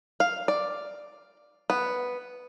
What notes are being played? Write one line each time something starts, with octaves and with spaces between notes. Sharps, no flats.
F5
D5
B3